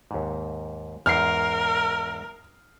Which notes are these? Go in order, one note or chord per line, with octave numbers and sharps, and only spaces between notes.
D#2 G#2
E2 G#2 A#4 F6 C7